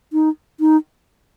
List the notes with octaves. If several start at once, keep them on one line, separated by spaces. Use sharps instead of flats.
D#4
D#4